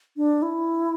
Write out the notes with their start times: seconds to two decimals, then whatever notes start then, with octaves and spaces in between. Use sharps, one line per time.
0.17 D4
0.42 E4